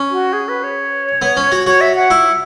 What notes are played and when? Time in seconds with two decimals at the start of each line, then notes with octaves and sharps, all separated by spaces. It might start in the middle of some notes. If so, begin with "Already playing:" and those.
Already playing: C#4
0.11 F#4
0.33 G#4
0.49 B4
0.63 C#5
1.22 B3
1.37 C#4
1.52 F#4
1.66 F#4 C#5
1.81 E5
1.96 F#5
2.10 E4